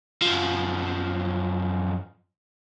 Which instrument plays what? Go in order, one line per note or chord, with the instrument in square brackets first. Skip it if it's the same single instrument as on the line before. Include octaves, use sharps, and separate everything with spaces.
[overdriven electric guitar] F#2 F3